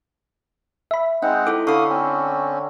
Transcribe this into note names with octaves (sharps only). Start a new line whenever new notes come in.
E5 B5
G#3 C4 D#4 F#5
E4 A4 D6
D3 C#5 D5 F5 B5 C#6 D#6
C4 C#4